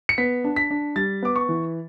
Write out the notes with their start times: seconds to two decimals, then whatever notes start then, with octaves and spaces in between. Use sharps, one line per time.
0.09 C#7
0.18 B3 B6
0.44 D4
0.56 B6
0.71 D4
0.96 G3 A6
1.22 B3 D6
1.36 C#6
1.49 E3